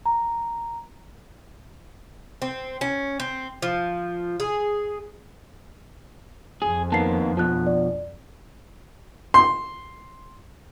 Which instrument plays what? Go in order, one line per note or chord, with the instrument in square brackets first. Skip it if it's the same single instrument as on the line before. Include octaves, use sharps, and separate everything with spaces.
[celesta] A#5
[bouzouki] C4
C#4
C4
F3
G#4
[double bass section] F2 [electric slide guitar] G#4
[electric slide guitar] D#3 A#3 B3 [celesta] A5 C7
[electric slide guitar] B2 F3 [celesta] A5 F#6
[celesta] D5
[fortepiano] C6